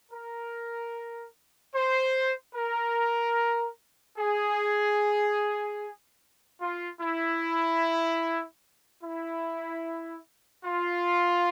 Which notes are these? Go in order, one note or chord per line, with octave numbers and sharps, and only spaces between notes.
A#4
C5
A#4
G#4
F4
E4
E4
F4